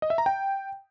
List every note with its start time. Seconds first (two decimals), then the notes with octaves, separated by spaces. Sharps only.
0.02 D#5
0.10 E5
0.18 A#5
0.26 G5